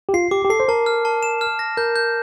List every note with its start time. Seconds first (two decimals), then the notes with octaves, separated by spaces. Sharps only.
0.09 G4
0.14 F4 C7
0.31 G4 D6
0.44 G4
0.50 A4 C7
0.60 C5
0.68 A#4 A5
0.86 F6
1.05 A5
1.23 E7
1.41 F6
1.59 A#6
1.77 A#4 G6
1.96 G6